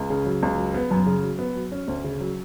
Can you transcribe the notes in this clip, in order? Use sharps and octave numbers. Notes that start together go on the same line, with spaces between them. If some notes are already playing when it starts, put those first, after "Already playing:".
Already playing: C#2
C#3
F#3
C#2
F#3
B3
F#2
C#3
F#3
B3
F#3
C#4
D2
C#3
F#3